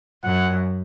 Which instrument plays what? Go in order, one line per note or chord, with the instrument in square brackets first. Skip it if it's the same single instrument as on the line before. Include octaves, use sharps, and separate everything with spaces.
[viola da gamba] F#2 [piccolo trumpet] F#5